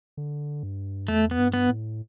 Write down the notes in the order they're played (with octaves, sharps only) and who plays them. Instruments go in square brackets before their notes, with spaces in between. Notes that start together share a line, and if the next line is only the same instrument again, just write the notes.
[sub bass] D3
G2
[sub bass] E2 [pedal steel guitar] A3
[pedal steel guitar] B3
[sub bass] G2
[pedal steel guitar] B3
[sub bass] A2